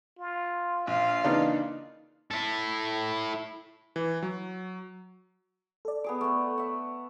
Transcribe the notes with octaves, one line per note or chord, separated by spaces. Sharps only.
F4
A#1 F4 F5
C#3 E3 A#3 D4 D#4
E4 A4
E3
F#3
A4 D5
B3 G#4 D6
A3 B3
E5 F#5